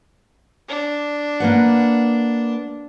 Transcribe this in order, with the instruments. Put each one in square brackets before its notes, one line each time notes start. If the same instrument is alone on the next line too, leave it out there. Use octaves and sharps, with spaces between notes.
[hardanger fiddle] D4
[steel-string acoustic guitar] A#3 B4 F#5